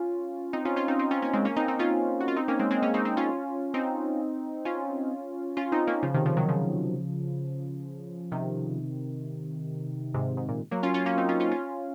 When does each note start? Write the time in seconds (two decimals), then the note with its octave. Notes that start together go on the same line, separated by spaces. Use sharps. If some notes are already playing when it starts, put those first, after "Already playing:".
Already playing: C#4 F4
0.53 C4 D#4
0.65 C#4 F4
0.76 C#4 F4
0.88 C4 D#4
0.99 C4 D#4
1.11 C#4 F4
1.22 A#3 C#4
1.33 G#3 C4
1.45 A#3 C#4
1.56 C4 D#4
1.68 C4 D#4
1.79 C#4 F4
2.20 F#4
2.28 F4
2.36 C4 D#4
2.48 A#3 C#4
2.59 G#3 C4
2.71 G#3 C4
2.82 A#3 C#4
2.94 C4 D#4
3.05 C4 D#4
3.17 C#4 F4
3.74 C4 D#4
4.65 C#4 F4
5.57 C#4 F4
5.72 C4 D#4
5.87 A#3 C#4
6.03 C#3 F3
6.14 C3 D#3
6.26 C#3 F3
6.37 D#3 F#3
6.49 C#3 F3
8.32 C3 D#3
10.14 G#2 C3
10.37 G#2
10.49 A#2
10.71 F#3 A#3
10.83 C#4 F4
10.94 C#4 F4
11.06 A#3 C#4
11.17 C4 D#4
11.29 C#4 F4
11.40 C#4 F4
11.51 C#4 F4